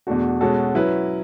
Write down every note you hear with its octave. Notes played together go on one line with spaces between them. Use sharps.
E2 B2 A3 D4 F#4
B2 G#3 C#4 F#4 A4
F#3 C#4 E4 B4